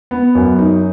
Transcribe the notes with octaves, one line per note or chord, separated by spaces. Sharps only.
B3
F#2
D#4